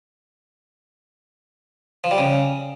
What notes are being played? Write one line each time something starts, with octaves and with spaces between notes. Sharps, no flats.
F3
G3
C#3